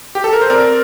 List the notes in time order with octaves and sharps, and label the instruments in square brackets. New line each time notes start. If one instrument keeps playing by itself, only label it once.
[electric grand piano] G4
A4
A#4
C5
C4 A#4 D5